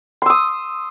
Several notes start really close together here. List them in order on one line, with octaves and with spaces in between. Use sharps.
C6 E6 D#6